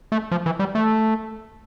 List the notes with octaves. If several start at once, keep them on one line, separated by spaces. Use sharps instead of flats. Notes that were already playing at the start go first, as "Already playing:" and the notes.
A3
F3
E3
G3
A3